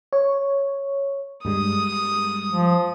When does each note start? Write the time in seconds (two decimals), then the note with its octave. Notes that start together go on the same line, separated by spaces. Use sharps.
0.13 C#5
1.45 G2 G3 G#3 D#6
2.52 F3